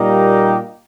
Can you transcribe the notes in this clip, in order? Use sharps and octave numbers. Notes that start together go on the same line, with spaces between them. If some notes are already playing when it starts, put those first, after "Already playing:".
Already playing: A#2 G3 A#3 D#4 G4